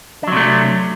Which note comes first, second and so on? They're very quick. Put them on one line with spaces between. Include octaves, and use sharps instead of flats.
D4 F#3 C3 A3